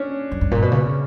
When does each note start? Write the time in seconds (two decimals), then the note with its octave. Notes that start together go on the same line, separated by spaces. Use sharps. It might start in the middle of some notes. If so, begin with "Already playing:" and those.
Already playing: C#4 D4
0.31 F#2
0.41 G2
0.51 A#2
0.62 B2
0.72 C#3